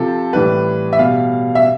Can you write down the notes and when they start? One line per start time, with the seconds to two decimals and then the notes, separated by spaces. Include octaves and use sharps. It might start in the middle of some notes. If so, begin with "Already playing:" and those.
Already playing: C3 F3 A4
0.33 A2 E3 G3 B4
0.93 E5
0.99 B2 G3 F5
1.55 E5